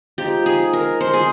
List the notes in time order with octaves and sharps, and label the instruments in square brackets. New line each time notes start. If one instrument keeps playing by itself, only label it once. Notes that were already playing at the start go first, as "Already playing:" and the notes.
[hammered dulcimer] F3 G#3 D#4 [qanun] G4
[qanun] G#4
A#4
C5
G#4